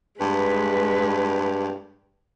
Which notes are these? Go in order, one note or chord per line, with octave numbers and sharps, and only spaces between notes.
G2 G#3 B4